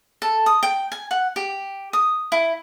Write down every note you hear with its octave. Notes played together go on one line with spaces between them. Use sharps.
A4
D#6
G5
G#5
F#5
G4
D#6
E4